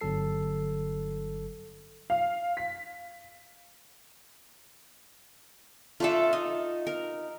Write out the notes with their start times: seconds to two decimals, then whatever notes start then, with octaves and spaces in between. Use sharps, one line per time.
0.01 G1 D3 F#3 A4 C7
2.10 F5
2.57 B6
6.00 A3 D4 F4 A4 E5
6.33 D#4
6.87 A#4